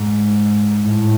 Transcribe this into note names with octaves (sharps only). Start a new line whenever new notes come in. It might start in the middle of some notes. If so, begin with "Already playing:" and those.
Already playing: G#2
A2